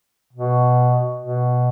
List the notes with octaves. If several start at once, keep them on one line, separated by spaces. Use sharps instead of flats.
B2
B2